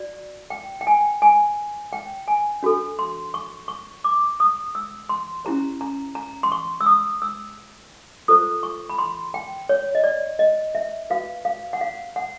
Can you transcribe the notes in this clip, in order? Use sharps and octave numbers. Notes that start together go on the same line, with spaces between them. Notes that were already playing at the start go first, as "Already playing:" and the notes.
Already playing: F#4 D5
G5
G5
G#5
G#5
G5
G#5
D4 F#4 A4
C6
C#6
C#6
D6
D#6
E6
C6
C#4 E4 G4 C5 A#5
A#5
A#5
C6
C#6
E6
D#6
E6
F4 A4 C5 D#6
C#6
B5
C6
G5
C#5
D#5
D5
D#5
E5
F#4 B4 F5
F5
F#5
F5
F#5